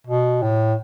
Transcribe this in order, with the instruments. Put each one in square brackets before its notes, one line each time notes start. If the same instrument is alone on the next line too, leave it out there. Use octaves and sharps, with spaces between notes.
[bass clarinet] B2
A2